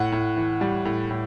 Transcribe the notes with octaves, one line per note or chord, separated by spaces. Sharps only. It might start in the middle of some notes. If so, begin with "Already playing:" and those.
Already playing: A2 F#5
A2
E3
G3
A2
A2